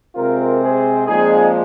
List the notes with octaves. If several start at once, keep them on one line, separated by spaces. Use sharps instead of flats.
C3 G#3 C4 F4 A#4
G#4 C5
A#2 F3 G#3 C4 D#4 G#4